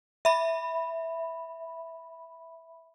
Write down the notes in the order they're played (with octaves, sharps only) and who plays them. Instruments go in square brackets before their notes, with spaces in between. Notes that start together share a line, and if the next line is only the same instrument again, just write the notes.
[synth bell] E5 B5